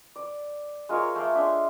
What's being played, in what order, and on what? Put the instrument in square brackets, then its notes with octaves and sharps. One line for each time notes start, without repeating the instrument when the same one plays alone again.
[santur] D5
G#3 F4 A#4 C#5
A3 C6 D6
G#3 D4 E5 D6